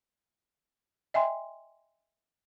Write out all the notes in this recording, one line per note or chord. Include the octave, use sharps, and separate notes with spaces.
D#5 E5 G5 G#5 C6